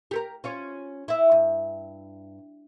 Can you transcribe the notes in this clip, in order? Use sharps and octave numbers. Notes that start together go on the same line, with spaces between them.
G4 A4 A#4
C#4 F4 C#5
E4 E5
G2